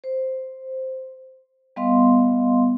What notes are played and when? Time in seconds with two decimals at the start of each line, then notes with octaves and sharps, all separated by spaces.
0.04 C5
1.76 G3 B3 D#5 F5 C6